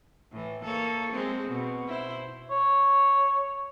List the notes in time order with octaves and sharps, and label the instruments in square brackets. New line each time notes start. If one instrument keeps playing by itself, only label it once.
[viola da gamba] A2 E3
A#3 A4 C#5
G#3 C4
B2
E4 C5
[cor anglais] C#5